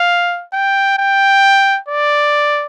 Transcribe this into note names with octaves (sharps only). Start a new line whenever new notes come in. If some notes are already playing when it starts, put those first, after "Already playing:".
Already playing: F5
G5
G5
D5